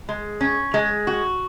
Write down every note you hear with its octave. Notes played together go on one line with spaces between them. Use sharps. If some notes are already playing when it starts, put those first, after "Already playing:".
G#3
C#4
G#3
F#4